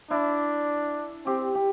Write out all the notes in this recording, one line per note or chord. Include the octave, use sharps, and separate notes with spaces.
D4 E4
C4 G4
G4